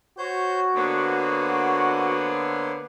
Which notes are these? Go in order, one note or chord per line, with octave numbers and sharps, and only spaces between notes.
F#4 C5 C#5 G6
D3 A#3 B3 C5 C#5